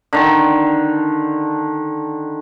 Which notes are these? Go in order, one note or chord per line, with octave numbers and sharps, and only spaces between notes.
D3 D#3